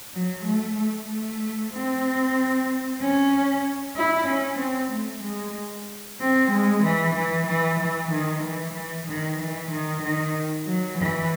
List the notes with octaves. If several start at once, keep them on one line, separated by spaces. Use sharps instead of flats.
F#3
A3
A3
A3
C4
C#4
E4
C#4
C4
A3
G#3
C4
G#3
E3
E3
E3
E3
D#3
E3
E3
D#3
E3
D#3
D#3
F#3
E3